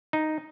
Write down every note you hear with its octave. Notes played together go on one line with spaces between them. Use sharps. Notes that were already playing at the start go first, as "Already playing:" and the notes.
D#4